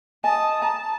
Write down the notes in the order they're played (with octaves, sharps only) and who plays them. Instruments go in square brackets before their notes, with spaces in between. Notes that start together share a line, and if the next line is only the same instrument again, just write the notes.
[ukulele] D#5 G#5 [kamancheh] A5 D#6
[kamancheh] A5 [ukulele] A#5